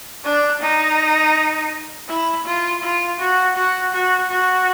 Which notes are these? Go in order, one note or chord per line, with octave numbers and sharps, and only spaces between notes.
D4
D#4
E4
F4
F4
F#4
F#4
F#4
F#4